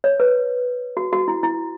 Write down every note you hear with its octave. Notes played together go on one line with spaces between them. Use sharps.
C#5
B4
F#4
F#4
E4
E4